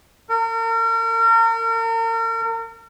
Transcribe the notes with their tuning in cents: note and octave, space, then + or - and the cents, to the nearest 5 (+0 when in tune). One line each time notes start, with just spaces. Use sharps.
A#4 -40